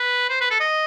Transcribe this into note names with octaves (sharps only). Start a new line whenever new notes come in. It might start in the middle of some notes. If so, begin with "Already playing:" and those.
Already playing: B4
C5
B4
A4
D#5